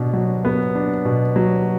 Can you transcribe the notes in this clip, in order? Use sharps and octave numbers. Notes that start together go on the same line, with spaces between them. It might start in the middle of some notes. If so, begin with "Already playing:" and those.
Already playing: B2 B3 D4
F#3
B3
D4
B2
F#3